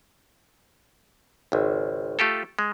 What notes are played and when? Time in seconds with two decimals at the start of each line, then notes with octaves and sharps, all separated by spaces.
1.52 G#1 C#2
2.19 A3 F4 G4 A4
2.59 G#3